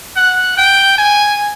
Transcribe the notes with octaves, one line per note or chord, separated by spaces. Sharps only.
F#5
G5
G#5